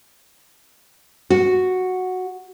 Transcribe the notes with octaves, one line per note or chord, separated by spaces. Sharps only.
F#4